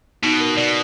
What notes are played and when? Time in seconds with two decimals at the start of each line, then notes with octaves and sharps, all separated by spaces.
0.23 B2 D#4
0.40 A#4
0.57 B2 D5